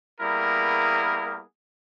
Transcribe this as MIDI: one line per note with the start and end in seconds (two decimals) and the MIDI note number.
0.21 1.41 55
0.21 1.41 58
0.21 1.41 59
0.21 1.41 64
0.21 1.41 68
0.21 1.41 70